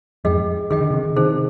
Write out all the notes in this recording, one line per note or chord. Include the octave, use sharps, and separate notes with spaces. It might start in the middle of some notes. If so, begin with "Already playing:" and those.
F2 G#2 G#4 D#5 G5
D#3 G#4 D#5 G5
D3
C3 D#3
C3 D#3 D#4 G#4 C5